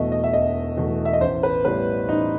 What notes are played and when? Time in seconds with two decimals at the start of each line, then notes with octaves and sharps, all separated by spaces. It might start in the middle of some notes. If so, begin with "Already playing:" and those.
Already playing: E1 E2 B2 A3 D#5 E5
0.12 D#5
0.24 E5
0.33 E1 D#5
0.77 E2 B2 A3
1.05 E5
1.13 D#5
1.21 A1 C5
1.43 B4
1.64 A2 G3 B3 B4
2.08 A1 D#4